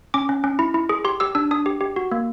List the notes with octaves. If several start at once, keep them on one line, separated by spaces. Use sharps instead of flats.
C#4 D6
C#4
C#4
E4
E4
G#4
G4 C6
G4 E6
D4 E6
D4 D#6
G4
G4
F#4
A#3